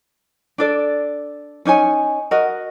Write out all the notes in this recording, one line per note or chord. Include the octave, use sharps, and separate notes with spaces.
D4 A4 D5
C#4 D#4 C#5 G#5
F#4 A#4 D#5